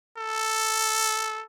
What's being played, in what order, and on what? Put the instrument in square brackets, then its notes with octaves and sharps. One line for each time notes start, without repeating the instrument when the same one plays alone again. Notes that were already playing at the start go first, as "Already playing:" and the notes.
[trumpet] A4